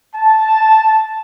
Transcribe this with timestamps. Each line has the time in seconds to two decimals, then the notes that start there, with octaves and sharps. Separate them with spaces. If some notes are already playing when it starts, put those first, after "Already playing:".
0.15 A5